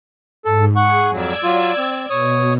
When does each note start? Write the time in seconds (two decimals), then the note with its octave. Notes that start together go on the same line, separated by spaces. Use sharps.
0.45 G#2 A4
0.76 G#4 F#5 C#6
1.12 F2 F#3 D5 E6 G#6
1.43 F#3 F4
1.78 C4
2.10 B2 C#5 D#6